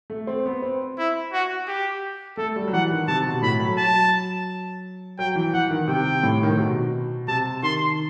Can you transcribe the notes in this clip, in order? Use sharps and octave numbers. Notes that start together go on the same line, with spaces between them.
A3
C4
B3
C4
E4
F#4
G4
A3 A4
G3
F#3
E3 F#5
D#3
C3 A5
B2
A2 B5
F#3
F#3 A5
F#3 G5
E3
E3 F#5
D#3
C3 G5
A2
D#3
C3
B2
C3 A5
D#3 C6